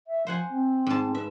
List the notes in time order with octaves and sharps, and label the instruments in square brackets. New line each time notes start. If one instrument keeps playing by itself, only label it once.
[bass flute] E5
[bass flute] F3 [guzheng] C5 F#5 G#5
[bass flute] C4
[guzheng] G#2 A5
[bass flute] B4 [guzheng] E5